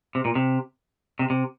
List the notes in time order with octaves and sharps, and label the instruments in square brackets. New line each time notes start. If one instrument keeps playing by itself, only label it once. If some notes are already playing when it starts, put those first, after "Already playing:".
[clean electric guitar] C3
A#2
C3
C3
C3